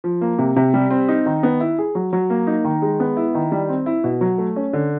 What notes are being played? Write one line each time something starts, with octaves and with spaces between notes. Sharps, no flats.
F3
A#3
C3
C3
G3
C4
D#4
D#3
B3
E4
G#4
F#3
F#3
A#3
D#4
D#3
G#3
B3
E4
D#3
G3
C4
E4
B2
F#3
A3
C#4
D3